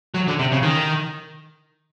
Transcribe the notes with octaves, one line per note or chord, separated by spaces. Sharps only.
F#3
D3
C3
C#3
D#3